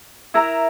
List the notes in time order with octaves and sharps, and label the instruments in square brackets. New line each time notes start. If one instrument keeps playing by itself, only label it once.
[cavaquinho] E4 A#4 E5 A#5